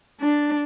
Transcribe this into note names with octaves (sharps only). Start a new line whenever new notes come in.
D4